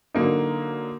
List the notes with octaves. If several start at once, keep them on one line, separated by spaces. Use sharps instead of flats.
D3 F#3 A#3 D#4